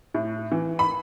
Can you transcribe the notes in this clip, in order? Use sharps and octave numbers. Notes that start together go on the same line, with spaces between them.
A2
E3
B5